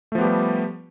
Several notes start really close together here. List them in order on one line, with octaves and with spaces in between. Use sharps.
A3 F3 B3 G4 G3